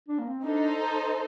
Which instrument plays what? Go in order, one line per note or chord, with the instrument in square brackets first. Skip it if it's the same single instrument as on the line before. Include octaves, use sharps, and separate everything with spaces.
[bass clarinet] D4
A#3
C4
C4
[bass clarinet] D4 [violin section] D#4 A4 C5